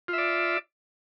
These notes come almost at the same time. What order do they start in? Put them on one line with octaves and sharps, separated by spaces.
F4 E5 D5